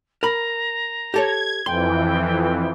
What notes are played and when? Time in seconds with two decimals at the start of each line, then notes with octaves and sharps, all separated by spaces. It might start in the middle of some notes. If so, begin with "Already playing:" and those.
0.23 A#4 A#5 B5
1.14 G4 A4 C#5 G#6
1.66 F2 E3 G5 C6